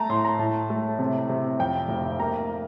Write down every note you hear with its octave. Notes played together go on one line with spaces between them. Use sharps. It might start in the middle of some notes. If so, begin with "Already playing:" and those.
Already playing: A3 A5 A#5
A2 C6
A#5
A2 A5
A3
C3
C3
F2 G5
F1
A#3 A#5